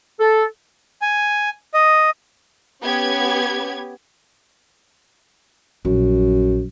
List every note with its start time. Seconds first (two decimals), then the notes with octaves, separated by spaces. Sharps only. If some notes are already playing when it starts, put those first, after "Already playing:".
0.20 A4
1.02 G#5
1.74 D#5
2.82 B3 C#4 G4 G#6
5.85 A#1 F#2